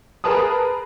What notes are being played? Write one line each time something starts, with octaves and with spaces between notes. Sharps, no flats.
G#4 A#4 B4 A5 B5 D#6